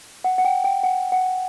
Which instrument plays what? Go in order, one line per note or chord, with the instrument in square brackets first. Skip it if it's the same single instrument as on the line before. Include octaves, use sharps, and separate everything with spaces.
[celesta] F#5
F#5
G5
G5
F#5
F#5